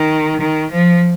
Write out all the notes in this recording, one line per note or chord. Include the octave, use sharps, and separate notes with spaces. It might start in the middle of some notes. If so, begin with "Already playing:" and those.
Already playing: D#3
D#3
F3